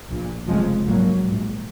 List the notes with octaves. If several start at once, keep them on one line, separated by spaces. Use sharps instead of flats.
A#1 A#2
F1 F2 C#3 F3 G#3
A#1 G#2 F#3 A#3
A#1 G#2